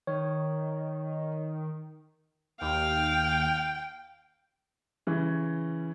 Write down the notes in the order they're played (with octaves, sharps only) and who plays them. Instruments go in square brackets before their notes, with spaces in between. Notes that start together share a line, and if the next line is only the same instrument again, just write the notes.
[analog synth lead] D#3 [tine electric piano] C#5
[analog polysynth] D#2 [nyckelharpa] F5 [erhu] G5
[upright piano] C#3 E3 C#4